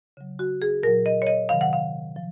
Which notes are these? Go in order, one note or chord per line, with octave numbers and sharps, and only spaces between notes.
C#3 F#3
F#4
G#4
A#2 F#3 A#4
D#5
C#5
D#5
C3 D#3 F#3 F5
F#5
F5
F3